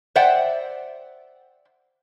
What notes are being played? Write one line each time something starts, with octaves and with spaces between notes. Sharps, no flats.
C5 D5 E5 F#5 G5